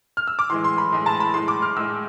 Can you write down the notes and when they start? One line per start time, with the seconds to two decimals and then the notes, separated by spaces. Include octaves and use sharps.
0.17 F6
0.28 E6
0.39 D6
0.50 A2 E3 G#3 C6
0.64 C6
0.78 B5
0.92 A2 E3 G#3
1.06 A5
1.20 B5
1.34 A2 G#3 C6
1.48 D6
1.62 F6
1.76 A2 G#3 E6